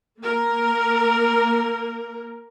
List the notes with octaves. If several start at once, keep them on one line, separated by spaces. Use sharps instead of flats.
A#3 A#4